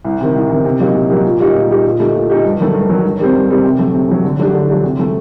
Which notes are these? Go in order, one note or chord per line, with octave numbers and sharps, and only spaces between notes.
C2
C3 D#3
C2
C3 D#3
C3
F#3 A#3 D#4 G4
C3
F#3 A#3 D#4 G4
A#2
G3 A#3 D#4 G4
A#2
G3 A#3 D#4 G4
A#2
A3 D#4 G4
A#2
A3 D#4 G4
G2
D#3 F#3 A3
G2
D#3 F#3 A3
G2
D#3 G3 C4
G2
D#3 G3 C4
C3
F#3 A3
C3
F#3 A3
D3
F#3 A3 D4 G4
D3
F#3 A3 D4 G4
C3
F#3 A3